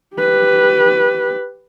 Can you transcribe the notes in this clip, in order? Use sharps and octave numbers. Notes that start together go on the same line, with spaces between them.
G4 B4